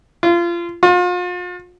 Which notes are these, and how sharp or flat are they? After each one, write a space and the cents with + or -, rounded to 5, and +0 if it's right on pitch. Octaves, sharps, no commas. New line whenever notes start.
F4 -25
F4 +40